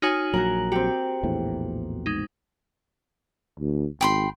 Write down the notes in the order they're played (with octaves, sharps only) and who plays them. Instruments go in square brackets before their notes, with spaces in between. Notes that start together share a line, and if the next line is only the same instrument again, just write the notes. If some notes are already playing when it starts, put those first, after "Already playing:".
[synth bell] D#4 F#4 C#5 [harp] G#5 D#6 F6
[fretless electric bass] A#1 F#3 [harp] F#4 A#4 [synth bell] F#7
[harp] C4 G4 [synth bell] F#4
[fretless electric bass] A#1 E2 A2
[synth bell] G#3 D#4
[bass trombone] D2
[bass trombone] G#1 [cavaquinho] G5 B5 C6